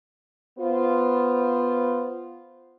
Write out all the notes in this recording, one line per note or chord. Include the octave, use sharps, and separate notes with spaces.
B3 F4 C5